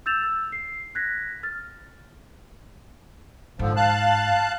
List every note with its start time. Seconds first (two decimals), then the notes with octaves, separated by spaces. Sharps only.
0.06 E6 G6 A6 E7 F7
0.23 E6
0.52 C7
0.95 F#6 G#6 A#6 B6
1.43 F6 A6
3.59 G#2 D3 F3
3.76 F5 A5 F#6